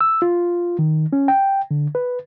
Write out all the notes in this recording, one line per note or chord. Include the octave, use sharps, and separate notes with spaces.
E6
F4
D#3
C#4
G5
D3
B4